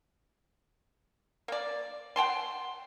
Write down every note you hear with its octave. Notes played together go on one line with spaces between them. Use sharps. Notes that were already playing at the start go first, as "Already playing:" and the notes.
A#3 D5
F#5 G5 A5 C6